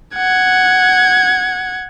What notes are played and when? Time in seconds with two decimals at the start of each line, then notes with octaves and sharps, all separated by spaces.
0.17 F#5 G#6